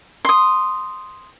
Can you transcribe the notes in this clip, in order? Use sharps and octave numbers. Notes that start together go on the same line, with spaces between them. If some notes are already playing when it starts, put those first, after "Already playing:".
C6 D#6